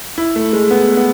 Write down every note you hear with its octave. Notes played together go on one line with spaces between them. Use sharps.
E4
A3
G#3
B3
B3